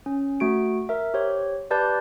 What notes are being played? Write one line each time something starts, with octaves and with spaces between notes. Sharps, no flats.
C#4
A3 F#4 D7
A#4 E5
G4 C5 C#5
G4 B4 D5 A5 G6